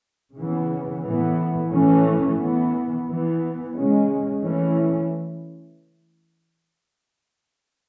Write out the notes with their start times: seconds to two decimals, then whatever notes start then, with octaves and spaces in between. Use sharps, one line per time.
0.37 C#3 E3 B3
1.05 A2 E3 B3
1.71 A2 E3 A3 C#4
2.39 E3 B3
3.07 E3 B3
3.74 C#3 G#3 C#4
4.42 E3 A3 C#4